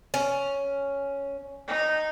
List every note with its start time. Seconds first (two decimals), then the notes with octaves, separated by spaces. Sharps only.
0.14 C#4
1.68 D#4